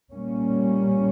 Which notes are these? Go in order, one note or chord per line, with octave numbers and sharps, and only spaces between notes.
A#2 G3 A#3 C#4